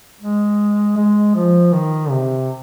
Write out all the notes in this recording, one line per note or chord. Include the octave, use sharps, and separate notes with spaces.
G#3
G#3
F3
D#3
C3